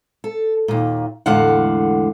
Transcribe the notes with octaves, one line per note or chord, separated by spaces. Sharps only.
A4
D#2 A#2
E2 A2 D3 G#3 F5 F#5